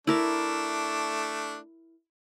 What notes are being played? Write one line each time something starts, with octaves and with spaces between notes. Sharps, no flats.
A3 D4 E4 A#4 D6